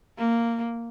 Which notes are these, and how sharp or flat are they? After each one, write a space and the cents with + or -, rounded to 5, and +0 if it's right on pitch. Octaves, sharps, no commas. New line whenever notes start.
A#3 -10